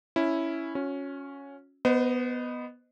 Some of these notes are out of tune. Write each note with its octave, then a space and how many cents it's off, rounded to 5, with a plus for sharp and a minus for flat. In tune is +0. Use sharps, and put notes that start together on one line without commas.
C#4 +0 E4 +0
C#4 +0 F#4 -40
B3 +0 C5 -35 D#5 -10